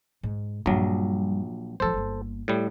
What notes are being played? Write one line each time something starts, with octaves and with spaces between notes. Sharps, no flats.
G#2
A#1 G2 F#3 G3
G#1 F3 A4 C5
G1 A#3
A2 G3